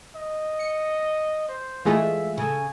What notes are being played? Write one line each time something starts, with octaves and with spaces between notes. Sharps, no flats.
D#5
C#7
C5
E3 G#3 A3 F4 G#4 E5
C#3 A4 G#5